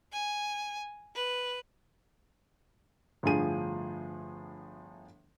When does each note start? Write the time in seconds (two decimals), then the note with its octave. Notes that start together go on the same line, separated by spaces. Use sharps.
0.13 G#5
1.15 B4
3.23 G1 A2 D3 F3 G#4 D#7